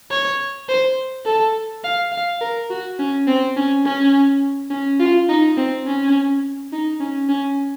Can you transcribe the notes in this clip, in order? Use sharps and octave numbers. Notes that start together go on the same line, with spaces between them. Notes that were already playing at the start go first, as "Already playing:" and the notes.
C#5
C5
A4
F5
F5
A#4
F#4
C#4
C4
C#4
C#4
C#4
F4
D#4
C4
C#4
D#4
C#4
C#4